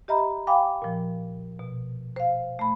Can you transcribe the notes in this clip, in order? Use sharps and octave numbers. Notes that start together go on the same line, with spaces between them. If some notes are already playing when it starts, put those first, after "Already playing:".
G4 D#5 E5 A#5 B5
F5 G5 G#5 B5 D6
A#2 F3
B2
C5 F5
A3 B5